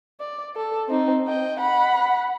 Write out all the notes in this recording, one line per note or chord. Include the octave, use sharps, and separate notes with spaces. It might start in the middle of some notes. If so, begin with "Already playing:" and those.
D5
A4
C4 D#4
D#5 G5
F#5 B5